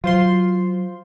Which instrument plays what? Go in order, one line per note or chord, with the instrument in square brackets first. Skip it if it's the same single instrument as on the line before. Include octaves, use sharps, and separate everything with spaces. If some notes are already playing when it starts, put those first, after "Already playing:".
[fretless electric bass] F#3 [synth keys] F4 C5 C6